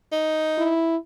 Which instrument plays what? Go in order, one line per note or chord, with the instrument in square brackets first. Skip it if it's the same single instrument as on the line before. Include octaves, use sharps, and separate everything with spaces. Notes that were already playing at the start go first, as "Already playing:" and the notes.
[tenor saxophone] D#4
[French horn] E4